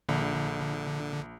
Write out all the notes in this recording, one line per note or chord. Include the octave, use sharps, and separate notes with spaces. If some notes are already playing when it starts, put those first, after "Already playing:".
A#1 D3